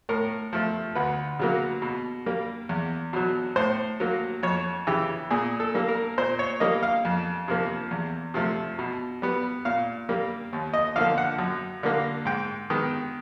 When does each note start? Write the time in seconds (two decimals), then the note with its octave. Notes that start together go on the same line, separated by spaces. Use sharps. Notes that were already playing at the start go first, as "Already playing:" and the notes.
0.09 A2 A#4
0.53 F3 A3
0.95 D2 B4
1.39 C#3 F#3 A#3
1.82 B2
2.26 G3 A#3
2.69 E2
3.13 B2 F#3
3.56 A2 C5
4.00 F#3 A#3
4.43 F2 C#5
4.87 C#3 E3 G4
5.31 A#2 G#4
5.60 A4
5.74 G3 A#3
5.88 A#4
6.18 A#2 C5
6.39 C#5
6.60 G3 A#3 D#5
6.83 F5
7.05 F2
7.48 C3 F3 A#3
7.91 E2
8.34 C3 F3 A3
8.79 B2
9.22 G3 B3
9.65 A#2 F5
10.09 G3 A#3
10.53 D#2
10.74 D#5
10.96 D3 F3 A#3 F5
11.18 F#5
11.38 F#2
11.83 D3 G3 A#3
12.25 G#2 G5
12.70 D#3 G#3 B3